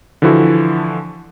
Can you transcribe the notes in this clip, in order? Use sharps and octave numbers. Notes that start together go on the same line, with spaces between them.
D3 E3 F3 E4 F#4 A4